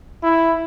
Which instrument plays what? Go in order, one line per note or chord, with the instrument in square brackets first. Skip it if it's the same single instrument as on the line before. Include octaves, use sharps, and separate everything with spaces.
[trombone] E4